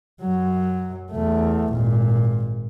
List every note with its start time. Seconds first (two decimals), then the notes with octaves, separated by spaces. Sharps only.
0.21 F#2 F#3
1.11 E2 A3
1.73 G#1 A#2